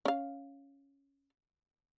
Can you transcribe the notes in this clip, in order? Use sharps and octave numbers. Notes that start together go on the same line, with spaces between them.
C#4 F5